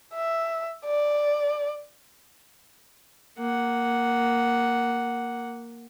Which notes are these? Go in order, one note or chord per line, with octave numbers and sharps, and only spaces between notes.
E5
D5
A#3 F#5